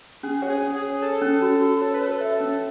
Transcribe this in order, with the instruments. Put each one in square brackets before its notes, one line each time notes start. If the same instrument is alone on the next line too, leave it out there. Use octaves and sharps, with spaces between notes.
[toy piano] C#4 [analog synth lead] G#4
[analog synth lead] F#4 [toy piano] C#5
[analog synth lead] G#4
[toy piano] C#4
[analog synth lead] G#4
[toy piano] C#5
[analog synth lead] A4 [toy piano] C#5
[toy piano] C#4
F#4
F#4
[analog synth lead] A4 [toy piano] C#5
[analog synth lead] B4
[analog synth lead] A4 [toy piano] C#5
[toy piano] E5
C#4